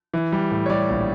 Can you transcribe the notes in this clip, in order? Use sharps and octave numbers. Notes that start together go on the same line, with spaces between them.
E3
G3
A2
C#5
G3 D5
A#1